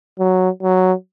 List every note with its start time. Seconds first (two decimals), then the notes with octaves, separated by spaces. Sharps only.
0.19 F#3
0.62 F#3